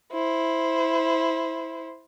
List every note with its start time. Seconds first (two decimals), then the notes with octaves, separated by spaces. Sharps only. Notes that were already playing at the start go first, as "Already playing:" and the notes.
0.13 E4 C5